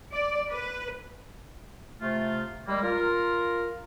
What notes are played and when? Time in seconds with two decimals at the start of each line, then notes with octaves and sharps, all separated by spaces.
0.12 D5
0.50 B4
2.01 C3 A3 F4
2.67 G3 G#3 A#3
2.83 F4 A#4